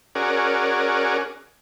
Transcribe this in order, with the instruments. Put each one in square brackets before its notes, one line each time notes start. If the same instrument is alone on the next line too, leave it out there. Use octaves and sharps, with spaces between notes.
[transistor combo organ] C#4 F#4 G#4 A#4 D5